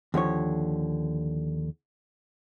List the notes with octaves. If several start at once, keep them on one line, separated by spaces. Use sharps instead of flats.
D#2 D3 F3 C#5